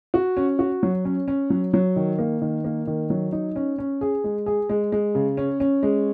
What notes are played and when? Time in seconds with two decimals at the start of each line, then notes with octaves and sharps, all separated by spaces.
0.14 F#4
0.37 C#4
0.59 F#4
0.83 F#3
1.05 C#4
1.28 C#4
1.50 F#3
1.74 F#3
1.96 D#3
2.19 A#3
2.42 D#3
2.64 A#3
2.87 D#3
3.10 F#3
3.32 D#4
3.56 C#4
3.78 C#4
4.01 G#4
4.24 G#3
4.46 G#4
4.69 G#3
4.92 G#3
5.15 C#3
5.37 C#4
5.60 C#4
5.83 G#3